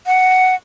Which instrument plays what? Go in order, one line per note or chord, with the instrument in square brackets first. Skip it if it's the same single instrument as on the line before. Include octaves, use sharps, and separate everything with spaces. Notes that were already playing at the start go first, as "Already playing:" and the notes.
[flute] F#5